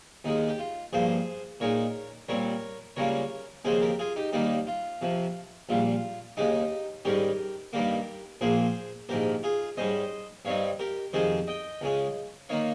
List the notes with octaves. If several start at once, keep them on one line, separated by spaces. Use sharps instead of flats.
D#2 D#3 G#3 D#4
G4
F4
G2 F3 A#3 G#4 C5
A#2 G#3 D#4 A#4 C#5
A#2 G3 C4 A#4 C#5
C#2 C#3 G3 A#3 C#4 A#4 C#5
D#2 C#3 F3 G#3 C4 G#4 C5
G4 A#4
F4 G#4
D#4 G4
D#2 D#3 G3 A#3 D#4 G4
F4
F2 C3 F3
A#1 A#2 G3 F4
D#2 C#3 G#3 D#4 G4
G#2 D#3 G3 C#4 G4 A#4
G2 D#3 G3 A#3 G4 A#4
A#1 A#2 F3 A#3 G#4 C5
A#1 G#2 D#3 G4 A#4
F4 G#4
G#2 G3 C#4 C5 D#5
G2 G3 C4 D#4 C#5 F5
G4 A#4
F2 C3 D#3 G#3 G#4 C5
D#5 G5
C#2 C#3 G#3 C#4
D#3 A#3 D#4 C#5 F5